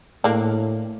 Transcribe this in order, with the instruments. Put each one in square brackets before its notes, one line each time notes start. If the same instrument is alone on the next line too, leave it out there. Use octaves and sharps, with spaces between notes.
[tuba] A2 [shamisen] A#3 D4